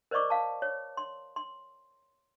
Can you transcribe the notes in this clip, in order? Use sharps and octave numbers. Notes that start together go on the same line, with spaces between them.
A#4 C5 D5 D#5 C#6 D6
F5 A5
C#5
C6
C6